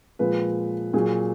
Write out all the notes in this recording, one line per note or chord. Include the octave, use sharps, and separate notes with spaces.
A#2 F3 G#3 B4
A#2 F#3 G#4